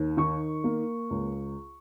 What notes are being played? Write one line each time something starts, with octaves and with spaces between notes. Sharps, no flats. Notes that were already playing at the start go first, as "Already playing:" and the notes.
Already playing: D#2
D#3 C#6
A#3
C#2